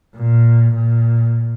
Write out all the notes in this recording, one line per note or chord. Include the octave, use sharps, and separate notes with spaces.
A#2
A#2